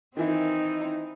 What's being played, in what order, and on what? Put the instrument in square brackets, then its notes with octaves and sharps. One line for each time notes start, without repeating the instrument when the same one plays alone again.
[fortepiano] D#3 E3 E4 [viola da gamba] C4 D#4